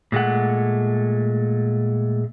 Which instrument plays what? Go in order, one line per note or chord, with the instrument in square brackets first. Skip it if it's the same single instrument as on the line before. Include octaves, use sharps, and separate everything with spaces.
[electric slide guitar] A#2 G#3 A3 F#5